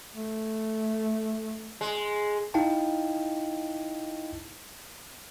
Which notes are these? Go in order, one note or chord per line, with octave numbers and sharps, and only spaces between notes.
A3
G#3
D#4 E4 D#5 F5 G5 A5